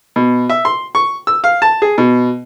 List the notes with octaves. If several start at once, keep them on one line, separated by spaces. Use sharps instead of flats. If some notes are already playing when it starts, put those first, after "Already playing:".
B2
E5
C6
C#6
E6
F5
A5
G#4
B2